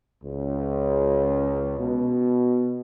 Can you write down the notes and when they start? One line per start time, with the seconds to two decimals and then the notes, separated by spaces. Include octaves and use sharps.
0.24 C#2
1.79 B2